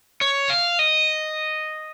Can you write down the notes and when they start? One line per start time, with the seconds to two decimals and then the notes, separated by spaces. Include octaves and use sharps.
0.21 C#5
0.50 F5
0.79 D#5